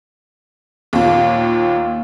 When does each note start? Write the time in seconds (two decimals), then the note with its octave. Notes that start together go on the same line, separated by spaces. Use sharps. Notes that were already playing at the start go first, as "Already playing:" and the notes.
0.93 D#2 A#2